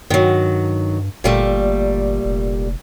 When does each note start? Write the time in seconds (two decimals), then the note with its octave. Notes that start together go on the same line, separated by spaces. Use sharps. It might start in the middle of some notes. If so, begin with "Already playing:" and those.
0.10 G2 D#3 F#3
1.24 G1 A#2 G3 A3
2.25 F1